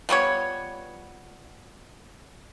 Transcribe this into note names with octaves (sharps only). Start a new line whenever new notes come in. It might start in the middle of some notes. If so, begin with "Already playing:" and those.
F3 G3 B3 C#5